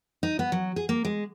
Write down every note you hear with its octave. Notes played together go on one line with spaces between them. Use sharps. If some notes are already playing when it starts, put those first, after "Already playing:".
D#4
B3
F#3
G#4
A#3
G#3